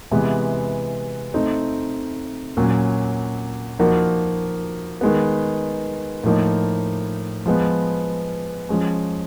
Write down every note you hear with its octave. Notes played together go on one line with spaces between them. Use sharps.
C3 E3 G#3 B3
A3 C4 D#4
A#2 F#3 A#3 C#4
F3 A#3 D#4 F#4 A#4
D#3 G#3 B3
A2 F3 A#3 D#4
F3 G#3 B3
F3 G#3 C#4